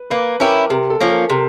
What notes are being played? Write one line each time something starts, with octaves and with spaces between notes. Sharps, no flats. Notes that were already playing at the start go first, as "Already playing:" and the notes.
Already playing: B4
A#3 B4
C#4 E4 G4 A#4
C3 A#4
A4
F3 A#3 C#4
A#4
C3 A#4